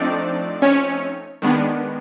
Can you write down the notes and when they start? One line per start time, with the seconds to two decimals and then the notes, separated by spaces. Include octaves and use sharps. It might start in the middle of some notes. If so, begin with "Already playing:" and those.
Already playing: F3 A3 C4 D4 D#4 D5
0.62 C#4 C#5
1.42 D#3 G#3 B3 D4